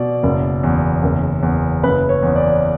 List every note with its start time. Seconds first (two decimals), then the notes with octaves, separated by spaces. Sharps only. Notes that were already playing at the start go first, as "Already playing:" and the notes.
Already playing: B2 D5
0.23 F#1
0.63 E2
1.03 F#1
1.43 E2
1.83 F#1 B4
2.09 C#5
2.23 E2
2.36 D5